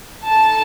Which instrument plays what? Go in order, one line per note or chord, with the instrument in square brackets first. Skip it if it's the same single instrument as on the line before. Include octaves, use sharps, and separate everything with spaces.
[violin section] D#4 A4 A5